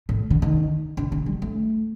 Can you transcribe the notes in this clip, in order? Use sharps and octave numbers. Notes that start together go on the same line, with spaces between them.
A2
D3
D#3
D3
D3
G3
A3